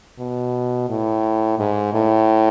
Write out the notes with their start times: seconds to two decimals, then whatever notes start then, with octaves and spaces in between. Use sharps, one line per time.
0.19 B2
0.89 A2
1.59 G#2
1.93 A2